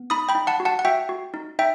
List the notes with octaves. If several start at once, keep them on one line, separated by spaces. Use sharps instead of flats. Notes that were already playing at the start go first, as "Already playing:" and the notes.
Already playing: B3
D#4 B5 D#6
G5 B5
D#4
F#5 A5
F#4
F#5 A5
F#5
F#4 E5 G5
F#4
D#4
D#4 E5 G5